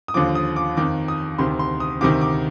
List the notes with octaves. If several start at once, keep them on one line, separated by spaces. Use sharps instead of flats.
D#6
D#2 D3 F3 D6
D#6
D6
F2 D#3 D6
D#6
D2 C3 D#3 C6
C6
D#6
D2 C3 D#3 D6
D6